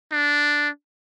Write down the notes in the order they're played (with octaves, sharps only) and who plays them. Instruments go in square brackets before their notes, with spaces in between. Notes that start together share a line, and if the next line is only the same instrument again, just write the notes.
[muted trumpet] D4